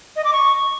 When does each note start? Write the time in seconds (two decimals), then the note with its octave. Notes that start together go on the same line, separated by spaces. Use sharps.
0.16 D#5
0.25 D6
0.33 C#6